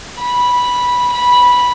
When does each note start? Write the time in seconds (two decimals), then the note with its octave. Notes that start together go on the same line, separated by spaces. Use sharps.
0.18 B5
1.12 B5